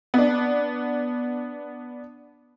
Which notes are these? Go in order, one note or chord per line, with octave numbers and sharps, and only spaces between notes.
B3 D4